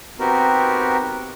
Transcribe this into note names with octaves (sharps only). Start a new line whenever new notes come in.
B3 C4 D#4 F#4 G4 A#4